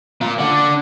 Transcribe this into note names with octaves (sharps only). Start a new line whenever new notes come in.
A#3 F4
D4 F#5